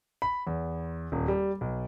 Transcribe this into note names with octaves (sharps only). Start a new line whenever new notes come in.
B5
E2
D#1
G3
B1